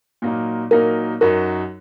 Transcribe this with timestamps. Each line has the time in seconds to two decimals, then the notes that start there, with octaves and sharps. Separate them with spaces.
0.22 A#2 F#3 A#3 D#4
0.71 A#2 F#3 A#3 D#4 A#4
1.21 F#2 F#3 D#4 F#4 A#4